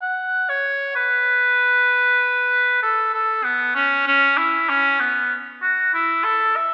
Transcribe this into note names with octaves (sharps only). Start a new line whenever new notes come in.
F#5
C#5
B4
A4
A4
B3
C#4
C#4
E4
C#4
B3
F#4
E4
A4
E5